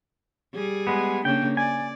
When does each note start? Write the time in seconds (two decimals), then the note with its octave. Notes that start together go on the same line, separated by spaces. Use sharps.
0.55 G3 G#4
0.87 G#3 B3
1.25 C#3 A#3 D4 G5
1.57 D5 G#5